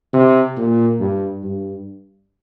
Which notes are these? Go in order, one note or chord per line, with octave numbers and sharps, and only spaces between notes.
C3
A#2
G2
G2